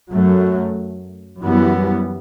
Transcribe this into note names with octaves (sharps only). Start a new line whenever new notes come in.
F#2 F#3 A3
F#2 E3 G3 B3